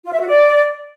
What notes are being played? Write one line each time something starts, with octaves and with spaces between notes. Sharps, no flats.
F4
E5
F#4
D5